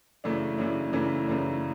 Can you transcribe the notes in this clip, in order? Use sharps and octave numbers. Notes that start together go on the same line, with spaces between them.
F#2 C#3 E3 A3 D4
F#2 C#3 E3 A3 D4
F#2 C#3 E3 A3 D4
F#2 C#3 E3 A3 D4